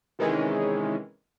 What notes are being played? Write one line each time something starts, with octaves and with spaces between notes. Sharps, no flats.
C3 D#3 E3 G#3 C#4